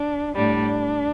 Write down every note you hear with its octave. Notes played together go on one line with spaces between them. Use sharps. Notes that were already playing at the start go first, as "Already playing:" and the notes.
Already playing: D4
A2 G3 D4